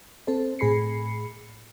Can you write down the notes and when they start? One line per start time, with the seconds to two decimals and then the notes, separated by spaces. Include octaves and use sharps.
0.27 C4 A4 C5
0.59 A2 G#4 B5 C7 C#7